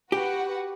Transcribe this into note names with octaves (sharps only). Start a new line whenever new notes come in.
F#4 G4 B4 F#5